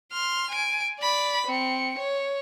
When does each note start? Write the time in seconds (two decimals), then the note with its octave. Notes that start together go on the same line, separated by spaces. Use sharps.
0.12 C6 F6
0.50 G#5 D7
1.00 D5 B5
1.47 C4 C#7
1.98 C#5